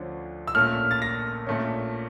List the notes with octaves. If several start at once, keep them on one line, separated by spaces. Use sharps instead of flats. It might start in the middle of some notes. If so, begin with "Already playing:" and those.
Already playing: D2 D3 F3 C#4
E6
A#1 A#2 A3 C#4 F6
A6
A#6
A#1 A#2 A3 C#4